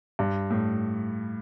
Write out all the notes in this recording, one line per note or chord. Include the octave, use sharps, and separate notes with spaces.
G2
A2